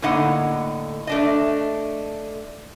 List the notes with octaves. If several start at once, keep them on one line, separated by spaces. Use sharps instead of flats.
A2 D3 A#3 D#4 D#5 F#5
A3 D4 D#5